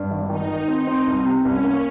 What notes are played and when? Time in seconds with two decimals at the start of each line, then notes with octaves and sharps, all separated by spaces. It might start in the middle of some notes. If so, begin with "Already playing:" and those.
Already playing: G2
0.11 G#1
0.30 D#3 D#4
0.48 D#3
0.67 C4
0.87 C4
1.07 C2
1.25 C3
1.44 C2 C#4
1.64 A#3